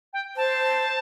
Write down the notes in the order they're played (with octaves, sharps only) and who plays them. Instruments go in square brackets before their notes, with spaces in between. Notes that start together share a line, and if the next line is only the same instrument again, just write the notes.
[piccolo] G5
[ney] C5 [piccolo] A5